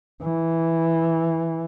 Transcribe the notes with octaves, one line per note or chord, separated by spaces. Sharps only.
E3